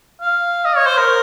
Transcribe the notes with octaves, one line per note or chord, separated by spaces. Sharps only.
F5
D#5
C#5
C5
A#4